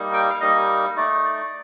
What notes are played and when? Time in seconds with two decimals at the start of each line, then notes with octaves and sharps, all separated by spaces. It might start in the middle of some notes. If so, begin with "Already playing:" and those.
Already playing: G3 A#3 D#4
0.14 G5
0.30 F5
0.41 G3 A#3 D#4 D#5
0.96 A3 D#4 D5
1.24 D5